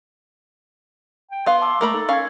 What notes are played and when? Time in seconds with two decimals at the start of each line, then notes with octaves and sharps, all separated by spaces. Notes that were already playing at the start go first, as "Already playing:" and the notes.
1.31 G5
1.46 B3 F5 C6
1.61 A5 D6 E6
1.81 A3 A#3 A#4 B5
1.94 D#4 A4
2.09 C#4 F5 C#6 G#6